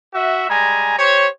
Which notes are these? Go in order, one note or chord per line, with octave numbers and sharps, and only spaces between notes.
F#4 E5
G3 G#3 G#5 A#5
G4 C5 C#5